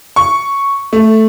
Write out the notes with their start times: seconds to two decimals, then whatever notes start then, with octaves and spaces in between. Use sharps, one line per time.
0.16 C#6
0.93 A3